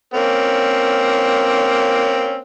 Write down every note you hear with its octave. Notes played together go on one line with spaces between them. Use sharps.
A#3 C4 C#4